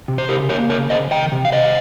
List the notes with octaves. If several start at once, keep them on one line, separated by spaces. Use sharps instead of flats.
C3
C5
C#3 G4 A#4
A#3 A#4 C#5
C#3 A#4 C#5
C#3 C5 D#5
D#3 D#5 G5
C3
F5
D#3 C5 D#5